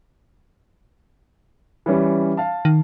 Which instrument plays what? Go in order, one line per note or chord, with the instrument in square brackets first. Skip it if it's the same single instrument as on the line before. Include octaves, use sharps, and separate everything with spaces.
[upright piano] E3 G3 C#4
F5 A5
[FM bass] D#3